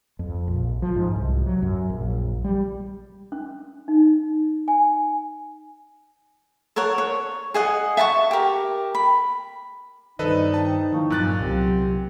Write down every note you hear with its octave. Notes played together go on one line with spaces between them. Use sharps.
F2
A#1
F3
G#2
C2
F#3
F#2
A#1
G3
C#4
D#4
G#5
A4 A#4 C#5 F#5
C#5
G#4 D#5 F#5
E5 F#5 A5 C#6
G4 A#4
B5
G2 D#3 D#4 A4 B4 C5 D5 D#5
C5 G5 A5
D#3 F3 A#3 E4 F5 C#6
G2 A#2 F#3 C4 A#4 F#6 A6
C2 B2 F#3 C4 G4